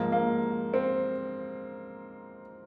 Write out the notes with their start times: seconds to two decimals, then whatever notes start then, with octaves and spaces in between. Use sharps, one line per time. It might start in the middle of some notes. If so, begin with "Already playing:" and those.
Already playing: G#2 F3 A#3
0.12 A#3
0.74 C4